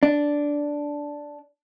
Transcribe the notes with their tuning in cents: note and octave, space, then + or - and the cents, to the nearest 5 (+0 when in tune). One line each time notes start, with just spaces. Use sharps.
D4 -5